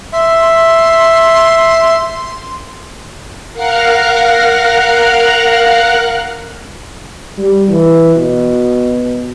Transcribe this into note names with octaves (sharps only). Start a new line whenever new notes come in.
E5 C6
A#4 F5 F#5 A#5 F6 F#6
G3
E3
B2